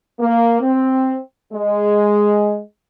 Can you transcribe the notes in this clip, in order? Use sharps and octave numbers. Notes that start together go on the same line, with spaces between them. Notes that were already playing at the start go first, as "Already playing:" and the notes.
A#3
C4
G#3